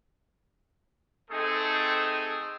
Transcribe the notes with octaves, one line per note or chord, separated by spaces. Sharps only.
A3 C4 D#4 G#4 A4